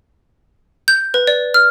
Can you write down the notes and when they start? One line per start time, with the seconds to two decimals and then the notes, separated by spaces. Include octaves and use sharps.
0.88 G6
1.14 B4
1.27 D5
1.54 F6